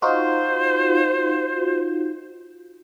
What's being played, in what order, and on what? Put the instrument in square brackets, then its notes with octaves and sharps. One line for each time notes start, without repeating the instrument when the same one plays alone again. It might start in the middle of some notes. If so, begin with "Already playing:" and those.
[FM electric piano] D#4 F4 F#4 [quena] C5